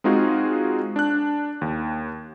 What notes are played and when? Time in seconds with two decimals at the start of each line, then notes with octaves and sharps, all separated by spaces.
0.04 G#3 C4 D#4 F4 F#4 G#4
0.96 D4 F#6
1.61 D#2